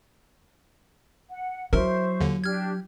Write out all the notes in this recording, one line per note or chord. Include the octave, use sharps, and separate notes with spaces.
F#5
F#3 E4 A#4 C5 E5 C#6
D#2 D3
D4 G4 F6 G#6